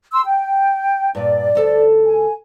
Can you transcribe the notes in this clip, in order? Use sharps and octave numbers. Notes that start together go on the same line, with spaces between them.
C6 E6
G5
G2 A#2 D5
D2 A4 A5
G#5